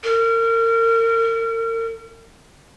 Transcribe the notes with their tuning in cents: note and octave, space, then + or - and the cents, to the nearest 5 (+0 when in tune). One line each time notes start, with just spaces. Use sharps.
A#4 -35